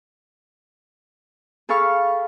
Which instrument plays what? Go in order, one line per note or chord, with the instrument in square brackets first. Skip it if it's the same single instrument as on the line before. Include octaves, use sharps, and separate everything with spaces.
[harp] G#4 A4 F5 B5 C#6 F6